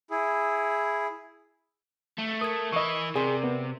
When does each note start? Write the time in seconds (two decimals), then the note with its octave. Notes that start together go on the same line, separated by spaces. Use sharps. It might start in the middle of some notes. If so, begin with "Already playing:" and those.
0.10 E4 G#4
2.18 A3
2.41 A#4 D#6 G#6
2.73 E3 E4 D#5 C#6
3.16 C3 G#4 A#4 D5 C6
3.44 B3